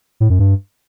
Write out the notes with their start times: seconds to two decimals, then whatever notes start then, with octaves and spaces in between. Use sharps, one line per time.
0.20 A2
0.30 F#2
0.39 G2